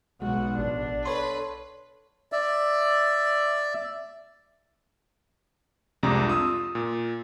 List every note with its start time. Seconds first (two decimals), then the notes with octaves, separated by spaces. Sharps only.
0.22 B1 G#3 F#4
0.59 A1 D4
1.05 A4 B4 C#5 C6
2.32 D5 E5
6.03 C2 F2 C3 G#3 D4 A#5
6.27 F4 D#6 E6
6.75 A#2